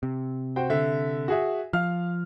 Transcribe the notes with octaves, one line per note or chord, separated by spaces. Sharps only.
C3
F#4 C5 G5
D3 E5
F#4 G#4 E5
F3 F5 F6